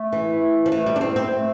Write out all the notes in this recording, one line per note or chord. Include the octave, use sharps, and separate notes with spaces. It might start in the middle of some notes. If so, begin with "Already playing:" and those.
Already playing: A3
E3
F3
E3 A3
G3
D4
C4
C4
A3